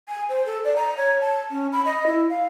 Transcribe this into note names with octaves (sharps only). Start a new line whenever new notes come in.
G#5
C5
A4
D5
A#5
C#5
A5
C#4
B5
D#5
E4
F5